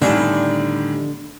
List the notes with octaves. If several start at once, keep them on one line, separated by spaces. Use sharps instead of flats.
A2 D3 D#3 G3 B3 D4 G#5 A5